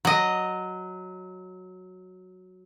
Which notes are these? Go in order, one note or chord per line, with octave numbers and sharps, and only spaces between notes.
F#3 D#5